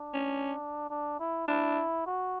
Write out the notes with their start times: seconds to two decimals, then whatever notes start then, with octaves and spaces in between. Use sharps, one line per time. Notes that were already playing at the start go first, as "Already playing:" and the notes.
Already playing: D4
0.14 C#4
0.90 D4
1.20 E4
1.48 D4 E4
2.06 F#4